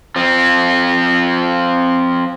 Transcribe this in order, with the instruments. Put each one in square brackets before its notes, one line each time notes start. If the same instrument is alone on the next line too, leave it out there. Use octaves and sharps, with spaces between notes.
[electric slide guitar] F3 C4